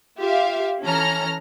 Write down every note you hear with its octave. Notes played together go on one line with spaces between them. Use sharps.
F4 G4 E5 F5
E3 C#4 A4 A#5 F6